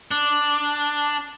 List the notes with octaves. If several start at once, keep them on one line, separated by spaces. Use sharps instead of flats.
D4